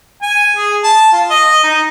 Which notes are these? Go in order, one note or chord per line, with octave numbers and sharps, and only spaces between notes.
G#5
G#4
A5
F4
D#5
D#4